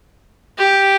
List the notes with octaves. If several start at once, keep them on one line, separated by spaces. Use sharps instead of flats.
G4